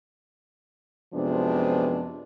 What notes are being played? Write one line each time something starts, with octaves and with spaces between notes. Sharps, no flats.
F#2 C3 F3 G#3 B3 D4